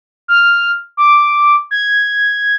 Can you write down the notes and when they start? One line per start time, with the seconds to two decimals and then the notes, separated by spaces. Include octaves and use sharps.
0.28 F6
0.97 D6
1.71 G#6